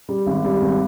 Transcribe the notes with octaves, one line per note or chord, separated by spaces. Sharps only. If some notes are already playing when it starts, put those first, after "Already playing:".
G3
G#1
G3
G#1